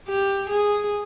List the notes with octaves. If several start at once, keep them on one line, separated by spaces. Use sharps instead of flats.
G4
G#4